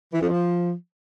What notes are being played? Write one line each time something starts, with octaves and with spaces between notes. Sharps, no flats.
E3
F2
F3